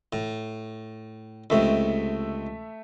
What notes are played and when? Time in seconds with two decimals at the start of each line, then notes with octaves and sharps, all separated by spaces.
0.13 A2
1.50 C#2 C3 A3 E5